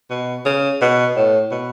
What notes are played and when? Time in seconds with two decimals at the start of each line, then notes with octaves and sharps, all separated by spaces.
0.10 B2
0.45 C#3
0.81 B2
1.16 A2
1.51 B2